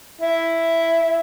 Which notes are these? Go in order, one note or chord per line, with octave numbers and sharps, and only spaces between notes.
E4